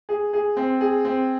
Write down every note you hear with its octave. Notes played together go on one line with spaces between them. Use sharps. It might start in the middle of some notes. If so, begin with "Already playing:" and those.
G#4
G#4
C4
G#4
C4